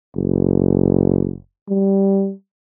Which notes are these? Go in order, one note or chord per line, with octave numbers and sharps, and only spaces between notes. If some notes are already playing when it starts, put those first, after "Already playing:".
F#1
G3